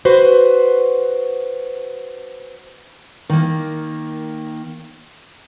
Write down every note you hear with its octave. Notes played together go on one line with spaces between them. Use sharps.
F#4 B4 C5
D#3 A#3